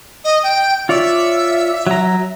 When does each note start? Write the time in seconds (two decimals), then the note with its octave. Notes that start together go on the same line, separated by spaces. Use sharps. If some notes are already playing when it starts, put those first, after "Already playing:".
0.24 D#5
0.43 G5
0.89 F4 C#5 D5 E5
1.87 F#3 A#5